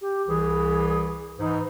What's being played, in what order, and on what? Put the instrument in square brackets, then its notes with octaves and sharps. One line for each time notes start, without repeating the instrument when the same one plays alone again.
[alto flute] G4
[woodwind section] C2 E3 [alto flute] G#4
[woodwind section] G#2 E3 [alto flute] D#4